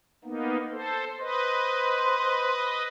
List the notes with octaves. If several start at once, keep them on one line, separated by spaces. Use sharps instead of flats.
A#3 B3 D#4
A4 C5
B4 C5 D#5